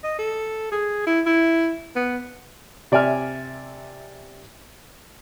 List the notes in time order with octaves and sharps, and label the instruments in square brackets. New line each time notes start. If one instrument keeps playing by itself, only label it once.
[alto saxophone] D#5
A4
G#4
E4
E4
B3
[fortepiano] C3 D5 E5 G#5 F6